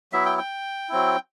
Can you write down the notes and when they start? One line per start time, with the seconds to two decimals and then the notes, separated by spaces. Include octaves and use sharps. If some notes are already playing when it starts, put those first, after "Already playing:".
0.12 F#3 B3 E4 E5
0.25 G5
0.38 G5
0.89 F#3 C4 E4